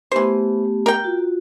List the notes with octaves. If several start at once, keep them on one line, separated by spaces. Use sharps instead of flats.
E3 A3 B3 G4 C5
A#4 G5
F4 F#4